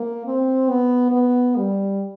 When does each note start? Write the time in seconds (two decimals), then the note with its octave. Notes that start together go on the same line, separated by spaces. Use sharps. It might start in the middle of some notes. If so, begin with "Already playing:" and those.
Already playing: A#3
0.26 C4
0.69 B3
1.12 B3
1.57 G3